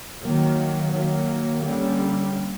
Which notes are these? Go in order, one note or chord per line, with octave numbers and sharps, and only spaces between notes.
D#3 F#3 A#3
D#3 F#3 A#3
D3 G3 A#3 C#4